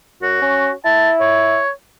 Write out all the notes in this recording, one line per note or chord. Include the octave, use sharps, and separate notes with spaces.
F#2 F#4
C#4
E4 A5
C#5